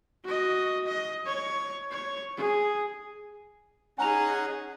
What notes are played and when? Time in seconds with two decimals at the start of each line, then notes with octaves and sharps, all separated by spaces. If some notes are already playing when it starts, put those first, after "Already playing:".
0.24 F#4 D#5
0.86 D#5
1.26 C#5
1.91 C#5
2.37 G#4
3.98 C#4 D#4 G#4 F#5 G#5 A#5 F7